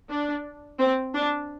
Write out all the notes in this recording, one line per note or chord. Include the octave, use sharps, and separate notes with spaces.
D4
C4
D4